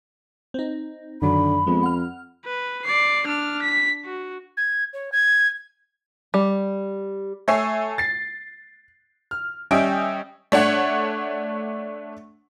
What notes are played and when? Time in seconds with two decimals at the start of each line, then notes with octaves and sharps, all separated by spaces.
0.54 C4 D#4
1.22 F#2 D3 D#3 F#3 B5
1.67 F2 F3 G#3 B3
1.83 F#5 F6
2.46 B4
2.85 D5 C7
3.27 D4 F6
3.62 B6
4.05 F#4
4.57 G#6
4.93 C#5
5.12 G#6
6.34 G3
7.48 A3 C#5 G#5 E6 C7
7.98 A6 C7
9.31 F6
9.71 G3 C#4 D#5 E5 G5 D7
10.52 A3 D4 C#5 F#5